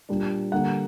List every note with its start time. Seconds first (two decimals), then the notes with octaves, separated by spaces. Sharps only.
0.09 A#2 G3 A#3 D4
0.52 D3 G3 A#3 F#5